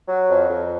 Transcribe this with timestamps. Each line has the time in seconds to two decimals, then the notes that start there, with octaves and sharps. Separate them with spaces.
0.08 F#3
0.29 F2
0.49 F2